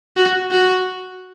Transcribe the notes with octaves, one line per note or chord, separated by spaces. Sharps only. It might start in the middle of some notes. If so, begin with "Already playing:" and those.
F#4
F#4